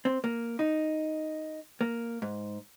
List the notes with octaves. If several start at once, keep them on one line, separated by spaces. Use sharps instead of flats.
C4
A#3
D#4
A#3
G#2